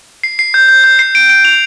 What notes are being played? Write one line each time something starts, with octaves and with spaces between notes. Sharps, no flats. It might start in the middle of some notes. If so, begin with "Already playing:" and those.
C7
C7
G6
G6
G6
C7
D7
D7
F7